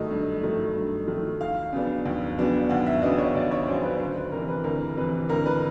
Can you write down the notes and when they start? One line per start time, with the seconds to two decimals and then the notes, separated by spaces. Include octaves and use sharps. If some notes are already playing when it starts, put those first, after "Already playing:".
Already playing: G2 D#3 F#3 A3 D#5
0.11 G2
0.43 D#3 F#3 A3
0.76 G2
1.07 D#3 F#3 A3
1.41 D#2 F5
1.73 C#3 F#3 B3 D4
2.06 D#2
2.38 C#3 F#3 B3 D4
2.69 D#2 F#5
2.87 E5
3.02 C#3 F#3 B3 D4 D#5
3.18 C#5
3.35 D#2 D5
3.51 C#5
3.67 C#3 F#3 B3 D4 C5
3.83 B4
3.99 D2 C5
4.16 B4
4.32 C3 E3 A#4
4.48 B4
4.64 D2 A#4
4.97 C3 E3 B4
5.29 D2 A#4
5.46 B4